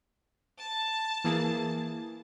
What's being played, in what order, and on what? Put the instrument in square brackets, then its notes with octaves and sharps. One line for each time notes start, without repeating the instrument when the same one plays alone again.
[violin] A5
[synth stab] E3 A#3 G#4